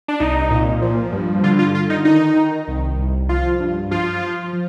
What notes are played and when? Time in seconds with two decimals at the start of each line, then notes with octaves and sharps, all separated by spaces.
0.08 D4
0.20 C2 D#4
0.51 A#2
0.82 F3
1.12 G2
1.43 D3 F4
1.59 F4
1.74 D3 F4
1.90 D#4
2.05 D#3 D#4
2.36 D#3
2.68 C2
2.98 C2
3.29 F3 F4
3.60 G2
3.91 F3 F4
4.22 F3
4.53 F3